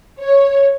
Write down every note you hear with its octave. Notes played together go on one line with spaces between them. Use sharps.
C#5